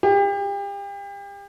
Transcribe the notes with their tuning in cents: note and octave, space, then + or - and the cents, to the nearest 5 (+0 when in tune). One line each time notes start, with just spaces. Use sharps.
G4 +35